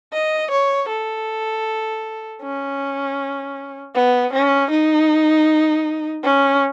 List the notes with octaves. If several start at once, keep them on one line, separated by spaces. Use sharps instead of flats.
D#5
C#5
A4
C#4
B3
C#4
D#4
C#4